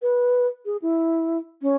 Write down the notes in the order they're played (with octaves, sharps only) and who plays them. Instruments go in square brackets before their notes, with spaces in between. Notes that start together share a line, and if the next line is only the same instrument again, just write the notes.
[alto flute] B4
G#4
E4
C#4